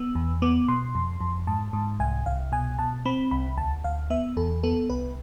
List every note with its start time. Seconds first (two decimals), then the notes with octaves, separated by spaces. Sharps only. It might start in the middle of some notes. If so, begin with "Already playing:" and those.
Already playing: B3 E6
0.15 E2
0.42 B3 D6
0.68 B2 C6
0.95 F2
1.21 F2
1.47 G#2 A5
1.73 G#2
2.00 C2 G#5
2.26 C2 F5
2.52 B2 G#5
2.79 B2 A5
3.05 C4 B5
3.31 C2 B5
3.58 D2 A5
3.84 D2 F5
4.10 B3 E5
4.37 E2 A4
4.63 B3 A4
4.90 C2 B4